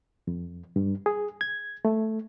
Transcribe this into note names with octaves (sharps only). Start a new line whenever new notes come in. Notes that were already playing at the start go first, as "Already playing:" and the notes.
F2
G2
G#4
G#6
A3